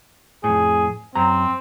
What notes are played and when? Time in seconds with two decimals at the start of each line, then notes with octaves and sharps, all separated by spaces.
0.44 F2 A2 G#4
1.15 F#2 C4 A#5